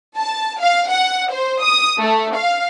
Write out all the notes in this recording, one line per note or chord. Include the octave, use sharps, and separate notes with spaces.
A5
F5
F#5
C5
D#6
A3
F5